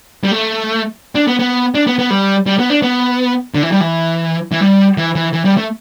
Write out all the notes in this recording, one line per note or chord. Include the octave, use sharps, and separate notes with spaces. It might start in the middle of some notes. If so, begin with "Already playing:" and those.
G3
A3
D4
B3
B3
D4
B3
B3
G3
G3
B3
D4
B3
D3
E3
G3
E3
E3
G3
E3
E3
E3
G3
A3